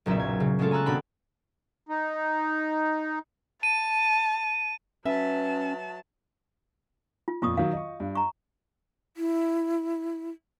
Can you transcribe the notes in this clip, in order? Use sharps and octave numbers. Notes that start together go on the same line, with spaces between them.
F#1 B1 A#2 C#4 E5
G#6
C#3
F#3 G#3 A3 C#4 F4 A4
G#5 A#5 E6 F#6 A6
D#1 B2 B3 D4 G5 B5
D#4
A5 D#7
F#3 C#4 B4 E5 A5
F4
F2 A#2 F4 C#6 D#6
D#3 F#3 F5
D#5 C#6
G2
A#5 C#6
E4